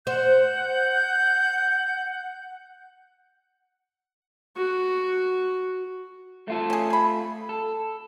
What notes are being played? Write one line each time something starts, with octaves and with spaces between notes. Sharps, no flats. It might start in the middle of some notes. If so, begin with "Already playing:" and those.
C5 F#5 G6
F#4
A3 F4 A4
C#4 G#4
G#4 B5
A4